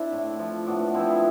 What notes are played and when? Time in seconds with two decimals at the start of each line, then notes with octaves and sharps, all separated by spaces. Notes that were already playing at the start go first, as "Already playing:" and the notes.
Already playing: C4 D4 E4
0.12 A2
0.39 F3
0.67 A2 B3 D4
0.94 F3 C4 E4
1.08 E4 G#4